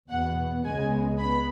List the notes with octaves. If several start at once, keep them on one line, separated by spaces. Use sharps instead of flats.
E2 B2 B3 F#5
C#2 C#3 G#3 B3 G#5
B3 B5